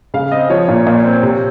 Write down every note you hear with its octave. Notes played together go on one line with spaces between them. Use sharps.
C#3 F5
C4 D#5
F3 C#5
A#2
A#2
C4
C3